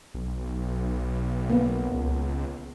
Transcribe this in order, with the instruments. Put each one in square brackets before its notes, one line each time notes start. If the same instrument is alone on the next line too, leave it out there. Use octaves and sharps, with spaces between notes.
[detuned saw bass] B1
[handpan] A#3 B3
[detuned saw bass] C#2